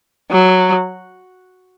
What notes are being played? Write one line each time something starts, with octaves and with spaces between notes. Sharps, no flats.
F#3